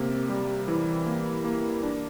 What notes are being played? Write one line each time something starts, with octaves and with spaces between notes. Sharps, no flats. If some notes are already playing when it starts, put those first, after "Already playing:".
Already playing: C3 A#3
G3
E3
A#3
A#3
D4